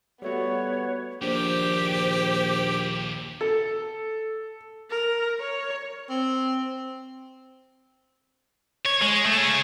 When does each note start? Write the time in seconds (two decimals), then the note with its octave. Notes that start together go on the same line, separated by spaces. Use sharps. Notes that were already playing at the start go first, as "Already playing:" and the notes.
0.22 G3 A3 B3 F#4 C#5
1.21 A#1 D#2 A#2 G4 C5
3.41 A4
4.90 A#4
5.40 C#5
6.10 C4
8.86 C#5
9.02 G#3
9.26 A3
9.37 G#4 C#5